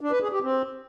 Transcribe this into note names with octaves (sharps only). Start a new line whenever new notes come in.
D4
B4
G#4
G4
C4